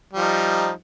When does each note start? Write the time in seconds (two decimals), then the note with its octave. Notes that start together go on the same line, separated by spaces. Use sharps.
0.13 G3
0.17 F3
0.21 D#4